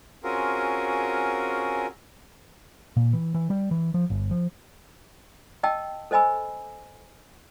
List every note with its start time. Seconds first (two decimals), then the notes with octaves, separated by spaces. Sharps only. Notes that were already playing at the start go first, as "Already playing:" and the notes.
0.24 C4 C#4 F4 F#4 G#4 A#4
2.97 A#2
3.13 E3
3.34 E3
3.50 G3
3.71 E3
3.94 F3
4.10 G1
4.31 F3
5.63 D#5 G5 A5 E6
6.11 A4 C5 D#5 G#5 B5 E6